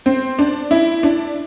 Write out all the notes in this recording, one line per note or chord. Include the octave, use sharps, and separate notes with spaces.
C4
D4
E4
D4